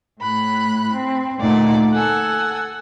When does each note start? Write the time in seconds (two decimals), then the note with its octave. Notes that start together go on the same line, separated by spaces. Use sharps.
0.20 A2 B5 F#6
0.93 C4
1.39 D2 A#2 A3 D#4 D5 F#5
1.91 A4 F#5 G#5 E6